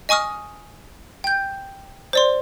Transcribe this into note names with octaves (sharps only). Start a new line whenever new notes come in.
D#5 G#5 C#6 D#6 F6
G5 G6
C5 D5 C6